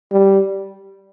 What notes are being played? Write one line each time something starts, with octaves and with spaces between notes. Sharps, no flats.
G3